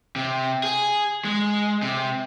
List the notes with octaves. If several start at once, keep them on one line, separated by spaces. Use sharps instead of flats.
C3
G#4
G#3
C3